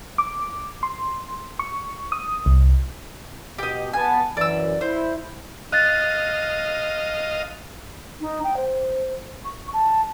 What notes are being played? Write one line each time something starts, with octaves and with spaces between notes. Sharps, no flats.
D6
C6
C#6
D#6
C2
B2 G4 D#5
B3 G#5 A5
F#2 E3 D5 E6
E4 C5
D#5 F5 F#6 A6
D#4
G5
C5
C#6
A5